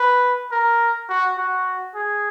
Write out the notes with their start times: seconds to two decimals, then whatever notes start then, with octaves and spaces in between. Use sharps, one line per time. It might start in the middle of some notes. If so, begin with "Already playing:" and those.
Already playing: B4
0.51 A#4
1.09 F#4
1.38 F#4
1.95 G#4